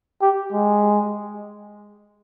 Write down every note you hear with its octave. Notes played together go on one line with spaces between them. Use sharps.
G4
G#3